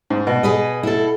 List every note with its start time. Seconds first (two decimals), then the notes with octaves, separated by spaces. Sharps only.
0.10 G#2
0.27 B2
0.43 G#4 B4 D#5
0.83 E4 A4